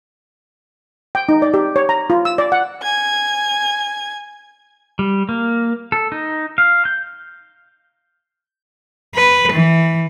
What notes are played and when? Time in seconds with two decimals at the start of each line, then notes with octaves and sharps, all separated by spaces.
1.15 G5
1.29 D#4
1.42 D5
1.54 G4
1.76 C#5
1.89 A#5
2.10 F4
2.25 E6
2.38 D5
2.52 F#5
2.82 G#5 G#6
4.99 G3
5.29 A#3
5.92 A4
6.12 D#4
6.58 F5
6.85 G6
9.16 B4
9.53 E3